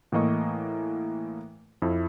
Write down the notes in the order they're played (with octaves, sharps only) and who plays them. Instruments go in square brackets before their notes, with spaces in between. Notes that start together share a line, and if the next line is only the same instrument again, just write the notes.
[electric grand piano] A2 E3 A#3 D#5 C#6
F2 E4